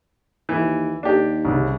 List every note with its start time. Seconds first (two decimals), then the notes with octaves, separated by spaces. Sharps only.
0.49 D#2 E3
1.03 D#2 D4 G4
1.45 C2 C#3